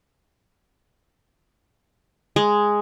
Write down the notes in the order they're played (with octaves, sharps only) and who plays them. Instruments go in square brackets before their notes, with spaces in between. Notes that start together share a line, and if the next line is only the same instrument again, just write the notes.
[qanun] G#3